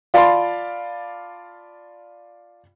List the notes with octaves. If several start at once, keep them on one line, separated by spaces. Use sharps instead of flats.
F4 D5 F5 A5 B5 C6